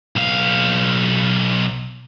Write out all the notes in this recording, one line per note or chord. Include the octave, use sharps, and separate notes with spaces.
B1 F5